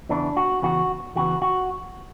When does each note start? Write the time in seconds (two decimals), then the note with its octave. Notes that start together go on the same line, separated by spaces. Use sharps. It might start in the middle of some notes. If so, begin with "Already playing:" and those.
0.09 E2 C#3 E3 D4
0.37 F#4
0.62 E2 C#3 E3 F#4
1.16 E2 C#3 E3 F#4
1.42 F#4